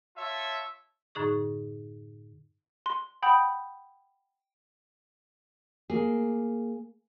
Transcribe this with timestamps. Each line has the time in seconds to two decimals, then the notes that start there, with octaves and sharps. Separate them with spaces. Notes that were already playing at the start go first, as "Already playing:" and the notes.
0.17 F4 C#5 E5 A5
1.15 F#2 A2 D3 D#4 G#4 C#6
2.86 C6
3.22 F#5 G5 B5 D#6 G6
5.90 A#3 G#4